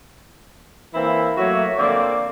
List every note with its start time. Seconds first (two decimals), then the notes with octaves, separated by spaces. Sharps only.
0.94 E3 A#3 C4 E4
1.37 F#3 A3 A#3 F#4 C#5 E5
1.78 D3 F3 A#3 C4 F4 D5